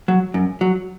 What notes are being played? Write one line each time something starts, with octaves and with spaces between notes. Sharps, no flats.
F#3
F#2
F#3